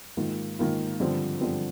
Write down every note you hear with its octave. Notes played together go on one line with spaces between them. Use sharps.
G#2 D#3 A#3 F4
G#2 D#3 A#3 F4
G2 D3 F3 C4
G2 D3 F3 C4